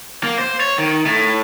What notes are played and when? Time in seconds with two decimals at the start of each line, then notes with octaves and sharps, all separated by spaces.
0.23 A#3
0.38 C5
0.60 C#5
0.78 D#3
1.06 A2